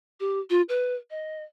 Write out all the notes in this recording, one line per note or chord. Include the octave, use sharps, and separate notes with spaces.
G4
F4
B4
D#5